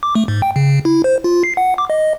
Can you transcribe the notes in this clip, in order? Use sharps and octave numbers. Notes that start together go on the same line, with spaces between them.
D6
A3
G#2
G5
C#3
E4
C5
F4
C7
F#5
D6
D#5